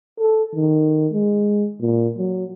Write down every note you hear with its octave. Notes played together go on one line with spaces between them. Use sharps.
A4
D#3
G#3
A#2
F#3